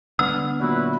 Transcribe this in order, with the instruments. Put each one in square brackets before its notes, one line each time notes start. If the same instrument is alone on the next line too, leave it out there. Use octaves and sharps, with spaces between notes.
[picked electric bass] D3 B3 [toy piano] E6 [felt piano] F6
[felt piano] A#2 F#3 [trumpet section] E4 F#4 B4